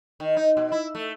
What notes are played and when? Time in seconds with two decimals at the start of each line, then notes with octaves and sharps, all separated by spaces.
0.20 D#3
0.37 D#4
0.57 B2
0.72 E4
0.95 A3